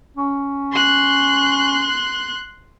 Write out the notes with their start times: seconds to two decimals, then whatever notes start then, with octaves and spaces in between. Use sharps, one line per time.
0.17 C#4
0.72 C6 F#6